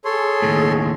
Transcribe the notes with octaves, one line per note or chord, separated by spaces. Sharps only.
G#4 A4 C#5 C6
D#2 A2